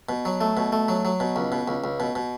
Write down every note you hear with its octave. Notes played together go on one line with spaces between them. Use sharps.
B2
F#3
A3
B2
A3
F#3
F#3
B2
C#2
B2
C#2
C#2
B2
B2